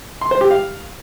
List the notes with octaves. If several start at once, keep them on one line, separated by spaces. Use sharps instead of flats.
C6
C5
G4
F5